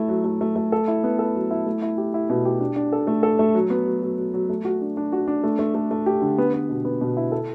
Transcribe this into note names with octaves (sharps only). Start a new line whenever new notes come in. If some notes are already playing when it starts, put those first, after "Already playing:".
Already playing: A3 E4
F#3
A3
A3
A3
A4
E4
B3
A4
F#3
E4
A3
E4
G4
E4
B2
G4
D4
D4
A4
A3
A4
A3
F#3
B3
F#3
F#3
F#3
F#3
A3
F#4
D4
D4
F#4
D4
A3
A3
A3
A3
G4
D3
B3
B3
B2
B3
B2
E4
A4